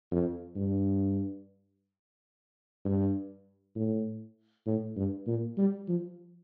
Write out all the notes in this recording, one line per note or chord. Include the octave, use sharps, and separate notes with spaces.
F2
G2
G2
A2
A2
G2
A#2
G3
F3